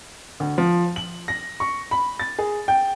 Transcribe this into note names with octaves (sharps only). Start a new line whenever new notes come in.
D2
F3
F#7
A#6
C#6
B5
A6
G#4
G5